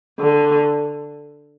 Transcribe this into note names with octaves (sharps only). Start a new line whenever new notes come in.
D3